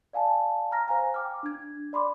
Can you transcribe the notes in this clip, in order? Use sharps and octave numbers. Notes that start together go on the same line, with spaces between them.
D5 F5 G#5 A5
A#5 F6 A#6
C5 F5 G#5 A#5
G5 D6 F6
D4 G#6
D5 B5 C6 D6